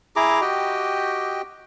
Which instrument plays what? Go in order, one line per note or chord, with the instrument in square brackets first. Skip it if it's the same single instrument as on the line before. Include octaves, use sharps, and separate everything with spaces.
[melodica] E4 G#4 A#5 D6
F#4 G4 D#5 G5